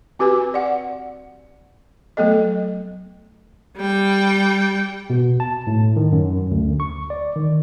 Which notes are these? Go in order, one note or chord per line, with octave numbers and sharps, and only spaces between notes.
C4 F#4 G4 B4 G#5
D5 F#5
F#3 A3 B3 A4 D#5
G3 G5
B2
A5
A2
D#3
F#2
D2
C#6
D5
D#3